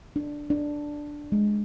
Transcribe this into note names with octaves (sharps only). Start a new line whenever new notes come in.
D4
D4
G#3